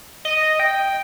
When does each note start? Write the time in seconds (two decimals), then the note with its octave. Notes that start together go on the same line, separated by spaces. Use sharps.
0.25 D#5
0.60 G5